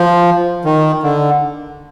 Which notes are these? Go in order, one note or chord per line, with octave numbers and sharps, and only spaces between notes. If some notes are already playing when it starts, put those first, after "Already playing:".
Already playing: F3
D#3
D3